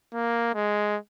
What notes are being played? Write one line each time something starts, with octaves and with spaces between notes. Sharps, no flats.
A#3
G#3